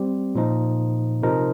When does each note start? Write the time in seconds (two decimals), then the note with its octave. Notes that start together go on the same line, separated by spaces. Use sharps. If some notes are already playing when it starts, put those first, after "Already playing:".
Already playing: G3 C4 G4
0.35 A#2 F3 D#4
1.22 C3 F3 D#4 A#4